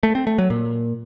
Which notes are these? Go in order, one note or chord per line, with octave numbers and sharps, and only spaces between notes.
A3
C4
A3
F#3
A#2